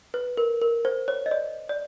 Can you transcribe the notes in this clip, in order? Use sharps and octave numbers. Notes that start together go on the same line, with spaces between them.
B4
A#4
A#4
C5
C#5
D#5
D5
D5